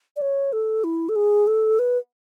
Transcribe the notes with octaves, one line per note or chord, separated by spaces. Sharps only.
D5
C#5
A4
E4
A4
G#4
A4
B4